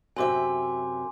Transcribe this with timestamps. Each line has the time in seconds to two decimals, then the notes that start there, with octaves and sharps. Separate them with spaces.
0.16 F#2 C3 E5 G#5 C6 D6